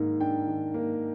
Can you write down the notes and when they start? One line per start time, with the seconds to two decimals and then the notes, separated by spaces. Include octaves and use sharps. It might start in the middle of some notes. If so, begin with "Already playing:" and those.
Already playing: G#2 D#3 A#3
0.20 D4 G5
0.47 D#3
0.74 A#3